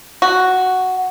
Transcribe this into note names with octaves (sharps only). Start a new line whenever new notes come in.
F#4